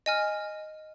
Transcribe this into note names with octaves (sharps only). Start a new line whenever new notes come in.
D#5 G#5 F6